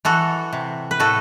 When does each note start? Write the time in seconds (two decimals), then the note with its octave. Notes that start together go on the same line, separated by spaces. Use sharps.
0.05 E3 F#4 A4
0.52 C3
0.91 B4
1.00 A2 F#4 A4